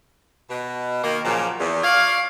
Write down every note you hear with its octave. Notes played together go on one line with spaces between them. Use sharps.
B2
D#3 A#3
A#2 C#3 F3 F#3 A#3
E2
F4 C#5 D5 F5